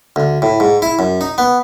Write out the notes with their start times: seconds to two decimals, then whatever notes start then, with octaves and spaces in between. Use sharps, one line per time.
0.16 D2
0.42 A2
0.60 G#2
0.82 E4
0.99 F#2
1.21 D#4
1.38 B3